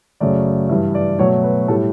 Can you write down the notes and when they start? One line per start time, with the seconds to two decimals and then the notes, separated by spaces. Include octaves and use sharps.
0.20 F#2 C#3 F#3 A3 D5
0.69 G2 E3 G3 E5
0.95 D5
1.19 B2 F#3 A3 C#5
1.43 B4
1.68 A2 G3 A4